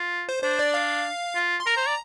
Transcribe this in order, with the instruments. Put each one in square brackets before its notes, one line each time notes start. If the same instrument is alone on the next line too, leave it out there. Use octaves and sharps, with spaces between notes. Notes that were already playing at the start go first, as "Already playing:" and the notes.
Already playing: [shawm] F4
[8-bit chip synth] C5
[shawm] D4 [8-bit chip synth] C5
[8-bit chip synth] D5
F5
[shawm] F4
[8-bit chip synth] C6
[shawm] A#4 [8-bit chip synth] A#5
[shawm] C5
D5